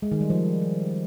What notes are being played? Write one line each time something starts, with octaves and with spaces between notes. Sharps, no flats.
G#3
D#3
G3
F3